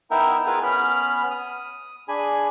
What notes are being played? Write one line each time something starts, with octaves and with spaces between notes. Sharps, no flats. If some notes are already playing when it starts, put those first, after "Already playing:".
B3 D#4 E4 A#4 E5 G5
B3 E4 F4 G#4 A#4 B4
B3 C#4 B5 F6
D#6
D4 G#4 G#5 B5